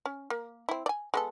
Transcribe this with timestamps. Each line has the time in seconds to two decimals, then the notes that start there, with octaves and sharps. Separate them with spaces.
0.06 C#4
0.30 A#3
0.69 C4 E4
0.86 D5 G#5
1.14 G#3 B3 A4